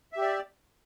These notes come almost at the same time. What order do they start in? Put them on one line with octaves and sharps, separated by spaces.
E5 G4 D5